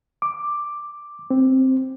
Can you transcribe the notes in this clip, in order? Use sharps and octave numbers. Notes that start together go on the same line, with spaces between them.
D6
C4